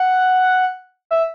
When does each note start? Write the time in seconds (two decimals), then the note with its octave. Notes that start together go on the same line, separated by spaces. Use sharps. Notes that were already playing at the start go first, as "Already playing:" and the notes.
Already playing: F#5
1.11 E5